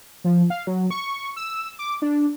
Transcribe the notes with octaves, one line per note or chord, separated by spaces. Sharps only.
F3
F5
F#3
C#6
E6
D6
D4